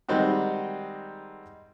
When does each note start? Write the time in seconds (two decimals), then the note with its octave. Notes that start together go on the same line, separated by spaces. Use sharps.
0.09 D#3 G3 G#3 C4 D#4 F#4